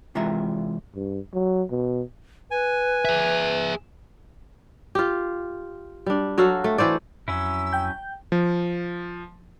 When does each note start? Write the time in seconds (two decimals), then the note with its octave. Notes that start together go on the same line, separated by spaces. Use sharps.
0.15 C3 E3 G#3 F4 E5 A#5
0.96 G2
1.34 F#3
1.71 B2
2.51 B4 G#5
3.05 G#4 E5
4.95 F4 G4
6.06 G3 D4
6.38 F#3 F#4 A4 F5
6.64 A3
6.78 E3 A3 C5 D5
7.28 F2 F#3 C#4 E4 E6
7.73 G5 G6
8.32 F3